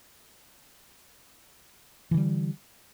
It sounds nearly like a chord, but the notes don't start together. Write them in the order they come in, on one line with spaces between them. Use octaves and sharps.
E3 D3 G3